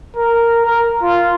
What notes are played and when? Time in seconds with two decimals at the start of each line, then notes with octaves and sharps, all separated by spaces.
0.16 A#4
0.65 A#4
1.02 F4